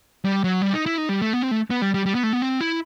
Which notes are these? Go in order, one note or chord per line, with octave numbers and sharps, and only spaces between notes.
G3
F#3
G3
D#4
E4
D#4
G3
A3
B3
C4
A3
B3
G3
G3
G3
B3
A3
B3
C4
E4